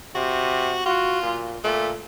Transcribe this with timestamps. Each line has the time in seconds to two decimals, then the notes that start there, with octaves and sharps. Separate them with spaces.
0.15 C3 F#4
0.86 F4 F#4
1.23 A#2
1.64 A#2 A3